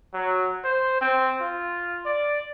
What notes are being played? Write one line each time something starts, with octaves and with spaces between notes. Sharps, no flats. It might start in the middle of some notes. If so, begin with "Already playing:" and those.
F#3
C5
C4
F4
D5